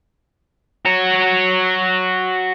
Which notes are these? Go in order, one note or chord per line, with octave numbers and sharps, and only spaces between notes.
F#4 C#5